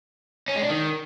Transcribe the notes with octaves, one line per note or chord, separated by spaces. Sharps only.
C#4
G#3
D4
D#3